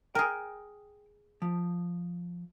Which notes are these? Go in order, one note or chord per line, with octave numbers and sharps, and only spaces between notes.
G#4 A#4 G5
F3